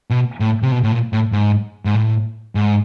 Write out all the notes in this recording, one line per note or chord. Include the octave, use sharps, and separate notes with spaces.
B2
A2
C3
B2
A2
A#2
A2
G#2
G#2
A2
G#2